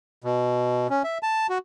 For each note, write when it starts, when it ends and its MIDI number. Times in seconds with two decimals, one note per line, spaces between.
0.24 0.87 47
0.90 1.03 61
1.04 1.18 76
1.23 1.47 81
1.50 1.58 66